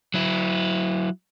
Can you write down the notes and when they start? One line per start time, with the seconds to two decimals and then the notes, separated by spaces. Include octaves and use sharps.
0.14 F#3 E4